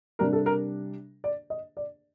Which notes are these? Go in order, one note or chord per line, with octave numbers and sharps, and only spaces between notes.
C3 G3 D4 A#4
A4
A#4
D5
D#5
D5